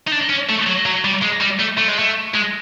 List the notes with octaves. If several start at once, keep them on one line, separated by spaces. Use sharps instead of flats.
D#4
D4
C#4
A3
F#3
F#3
G3
G#3
G3
A3
A3
G#3
A3
G#3